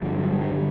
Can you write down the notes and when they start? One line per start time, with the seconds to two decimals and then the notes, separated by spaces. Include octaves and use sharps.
0.02 G2 D3 F3
0.17 F#3
0.32 G3
0.42 G3
0.51 D3